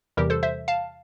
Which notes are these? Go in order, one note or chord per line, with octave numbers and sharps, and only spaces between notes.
E2 C3 E3 G3 G4 A#4
A4 C5
C5 E5
F5 A5